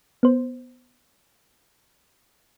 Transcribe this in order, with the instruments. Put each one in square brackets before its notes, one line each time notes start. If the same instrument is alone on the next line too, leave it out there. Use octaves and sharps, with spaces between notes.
[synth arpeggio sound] B3 C5